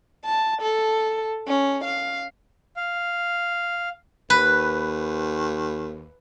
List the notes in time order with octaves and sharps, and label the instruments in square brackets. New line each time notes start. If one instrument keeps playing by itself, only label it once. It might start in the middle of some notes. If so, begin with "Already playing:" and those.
[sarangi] A5
A4
C#4
F5
[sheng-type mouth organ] F5
[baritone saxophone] D#2 [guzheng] B4